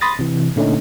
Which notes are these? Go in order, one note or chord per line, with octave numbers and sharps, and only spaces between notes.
B5 C6 D#6 A6 A#6
C3 E3
A#2 D3 A3 C#4 D#4